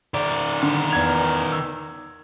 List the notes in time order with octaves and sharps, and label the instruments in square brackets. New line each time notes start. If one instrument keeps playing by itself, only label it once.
[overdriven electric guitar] D#3 D5
[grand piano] D3 C6
E2 G#6 F7
E6